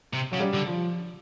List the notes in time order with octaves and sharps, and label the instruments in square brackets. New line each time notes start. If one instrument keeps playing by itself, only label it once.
[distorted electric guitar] C3
[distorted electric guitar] C#3 [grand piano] F#3
[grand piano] G3
[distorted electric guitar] D3
[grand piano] F3